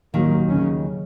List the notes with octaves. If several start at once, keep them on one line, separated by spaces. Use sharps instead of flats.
D#2 A#2 D#3 F#3 A#3
C#3 F#3 C#4